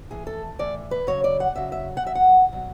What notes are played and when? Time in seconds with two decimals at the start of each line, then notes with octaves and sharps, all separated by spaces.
0.11 A2 E3 G#4
0.27 A4
0.59 A2 E3 D5
0.91 B4
1.07 C#3 F#3 C#5
1.24 D5
1.40 F#5
1.56 C#3 F#3 E5
1.72 E5
1.97 F#5
2.05 B2 F#3 E5
2.15 F#5
2.52 B2 F#3